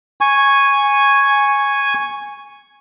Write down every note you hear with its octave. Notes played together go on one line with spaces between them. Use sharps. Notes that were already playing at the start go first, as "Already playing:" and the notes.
G#5 C#6